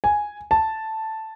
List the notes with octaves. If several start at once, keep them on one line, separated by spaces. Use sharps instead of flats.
G#5
A5